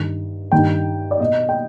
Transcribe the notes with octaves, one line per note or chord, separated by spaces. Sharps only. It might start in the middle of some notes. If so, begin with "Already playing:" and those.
Already playing: G2 D#3
G2 D#3 G5
D5
B2 D#5
G5